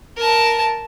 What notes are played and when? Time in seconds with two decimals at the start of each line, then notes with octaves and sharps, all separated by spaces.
0.17 A#4 A5